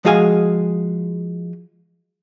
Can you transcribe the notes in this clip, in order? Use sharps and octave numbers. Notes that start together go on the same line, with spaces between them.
F3 G#3 F#4 G#4 F5 G#5